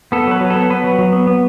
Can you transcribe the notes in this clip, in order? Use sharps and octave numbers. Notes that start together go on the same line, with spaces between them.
B3 A4
F#3 B4
F#3
A4
B3
B3 B4
F#3
F#3
B3
B3